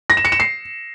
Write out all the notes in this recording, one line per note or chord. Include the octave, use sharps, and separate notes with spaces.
A#6
E7
C#7
E7
C7